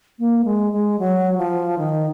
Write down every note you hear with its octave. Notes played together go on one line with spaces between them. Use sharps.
A#3
G#3
G#3
F#3
F3
D#3